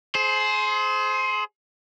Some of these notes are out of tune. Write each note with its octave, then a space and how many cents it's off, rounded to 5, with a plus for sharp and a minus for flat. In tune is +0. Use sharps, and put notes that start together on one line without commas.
G#4 +35 C5 +0